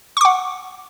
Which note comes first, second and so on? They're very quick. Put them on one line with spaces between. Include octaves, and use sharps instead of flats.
C#6 D6 F#5